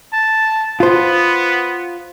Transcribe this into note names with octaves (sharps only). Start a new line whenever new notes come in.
A5
B3 F4 C5